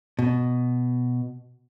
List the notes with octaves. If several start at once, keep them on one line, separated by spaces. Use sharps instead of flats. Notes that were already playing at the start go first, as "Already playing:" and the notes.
B2